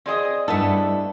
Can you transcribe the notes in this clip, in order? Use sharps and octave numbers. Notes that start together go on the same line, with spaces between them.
C4 G#4 D5 D#5
G2 A3 B3 D4 E4 A4